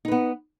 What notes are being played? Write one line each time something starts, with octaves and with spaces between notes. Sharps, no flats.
B3 D#4 B4